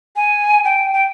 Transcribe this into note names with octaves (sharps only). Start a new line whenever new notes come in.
G#5
G5
G5